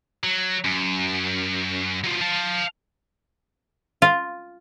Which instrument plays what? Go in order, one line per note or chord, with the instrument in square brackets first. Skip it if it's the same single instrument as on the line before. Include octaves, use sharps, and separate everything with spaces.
[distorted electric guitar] F#3
F#2
F#3 F4
F5 A5
[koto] F4